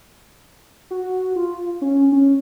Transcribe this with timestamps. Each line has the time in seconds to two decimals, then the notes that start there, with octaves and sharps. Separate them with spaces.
0.91 F#4
1.36 F4
1.82 C#4
2.12 C#4